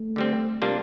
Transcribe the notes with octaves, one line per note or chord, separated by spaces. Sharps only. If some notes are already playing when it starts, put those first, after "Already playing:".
Already playing: A3
D3 G3 C4
C3 G3 A#3 D4 F4